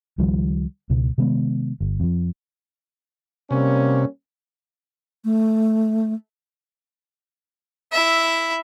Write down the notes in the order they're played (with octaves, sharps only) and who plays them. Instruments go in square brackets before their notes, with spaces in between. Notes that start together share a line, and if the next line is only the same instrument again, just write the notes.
[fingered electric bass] C#2 D#3 F3 G3
C#2 B2
C3 D#3 G#3 B3
G1
F2 F3
[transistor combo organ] C3 [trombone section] G3 A#3 C#4
[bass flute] A3
[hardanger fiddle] E4 E5